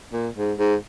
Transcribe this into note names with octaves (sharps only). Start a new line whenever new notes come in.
A#2
G#2
G#2